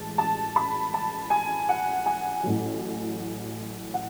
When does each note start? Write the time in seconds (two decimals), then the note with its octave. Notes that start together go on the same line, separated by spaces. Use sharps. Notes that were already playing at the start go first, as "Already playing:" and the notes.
Already playing: A2 E3 G#3 A5
0.18 A5
0.56 B5
0.94 A5
1.30 G#5
1.69 F#5
2.06 G#5
2.43 A1 A2 F#3
3.94 F#5